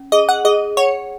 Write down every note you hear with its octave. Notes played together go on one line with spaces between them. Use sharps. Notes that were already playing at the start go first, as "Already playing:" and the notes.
Already playing: C#4
G#4 D#5
F#5
G#4 D#5
C#5 F#5